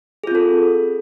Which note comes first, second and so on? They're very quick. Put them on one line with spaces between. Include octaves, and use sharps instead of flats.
G#4 F4 C4 A4